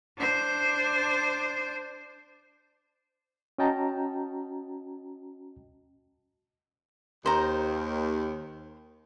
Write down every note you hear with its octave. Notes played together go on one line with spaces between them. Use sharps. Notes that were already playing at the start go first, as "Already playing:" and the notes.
D4 C5
C#4 F#4 D#5 G5 A5 A#5
D#2 C5 A#5